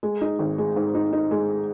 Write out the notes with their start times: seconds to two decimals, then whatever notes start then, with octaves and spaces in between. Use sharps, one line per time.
0.03 G#3
0.21 D#4
0.39 G#1
0.58 G#3
0.76 G#2
0.95 D#4
1.13 D#4
1.31 G#3